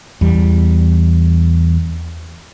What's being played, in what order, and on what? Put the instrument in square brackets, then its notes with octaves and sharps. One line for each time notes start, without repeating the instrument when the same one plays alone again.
[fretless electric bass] E2 G3